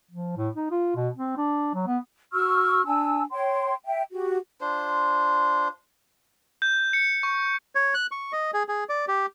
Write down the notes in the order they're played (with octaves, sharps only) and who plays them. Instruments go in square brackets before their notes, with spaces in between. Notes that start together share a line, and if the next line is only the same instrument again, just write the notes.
[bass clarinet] F3
A2
D#4
F4
B2
C4
D4
F#3
B3
[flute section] F#4 C#6 E6 F6
D4 G#5 A5 E6
C#5 G5 C6
E5 G5
F#4 G4
[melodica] D4 F4 C5
[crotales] G6
C#7
C#6
[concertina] C#5
F#6
C#6
D#5
G#4
G#4
D5
G4